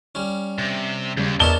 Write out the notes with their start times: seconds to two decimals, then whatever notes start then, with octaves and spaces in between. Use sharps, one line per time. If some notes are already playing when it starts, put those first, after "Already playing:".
0.15 G3 C#4
0.58 C3
1.17 D#2 C#3 G3
1.40 E2 D4 A#4 C#5 D#5 E5 A5 G7